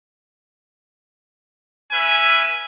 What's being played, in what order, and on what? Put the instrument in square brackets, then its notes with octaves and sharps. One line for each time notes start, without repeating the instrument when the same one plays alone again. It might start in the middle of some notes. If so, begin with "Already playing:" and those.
[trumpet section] C#4 B4 E5 G#5